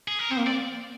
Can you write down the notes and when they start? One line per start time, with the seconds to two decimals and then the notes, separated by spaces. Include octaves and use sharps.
0.08 G#4
0.19 A#4
0.31 C4 C5
0.38 A#3
0.45 C4 D5